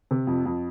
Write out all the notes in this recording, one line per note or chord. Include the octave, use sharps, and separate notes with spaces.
C3
F2
F2